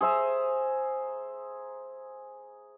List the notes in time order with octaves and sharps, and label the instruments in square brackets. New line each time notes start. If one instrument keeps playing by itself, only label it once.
[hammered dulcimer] G#4 C5 E5 A#5